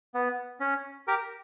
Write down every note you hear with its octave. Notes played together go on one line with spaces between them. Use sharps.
B3
C#4
G4 A#4